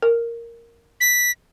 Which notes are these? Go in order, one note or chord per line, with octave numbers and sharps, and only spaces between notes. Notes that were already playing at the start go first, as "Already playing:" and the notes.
A#4
B6